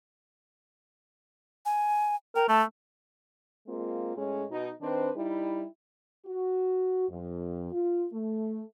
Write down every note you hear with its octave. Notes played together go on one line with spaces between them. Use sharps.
G#5
A#4 G5
A3 A5
G#3 A#3 C4 F4
A2 G#3 C#4
B2 D#4
D#3 C4 D4 B4 C5
G3 D#4 E4
F#4
F2
F4
A3